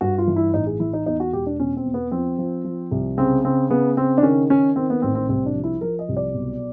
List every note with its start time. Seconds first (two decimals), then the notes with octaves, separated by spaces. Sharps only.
0.01 G2 F#4
0.18 F4
0.27 E3
0.36 E4
0.53 A1 D#4
0.67 G#4
0.80 E3 E4
0.93 D#4
1.06 E2 D#4
1.20 F#4
1.33 E1 G4
1.46 D4
1.59 B2 C#4
1.77 C4
1.85 E2
1.94 B3
2.11 F3 C4
2.38 F3
2.64 F3
2.91 C2
3.17 C#3 C4
3.44 C#3 C4
3.70 C#3 B3
3.97 C#3 C4
4.18 D4
4.23 D#3 C#4
4.50 D#3 C#4
4.76 D#3 C4
4.90 B3
5.02 A1 C4
5.15 C4
5.29 C2 C4
5.46 D4
5.55 F3
5.64 E4
5.81 F3 A#4
5.99 D#5
6.09 C2
6.17 D5
6.34 B1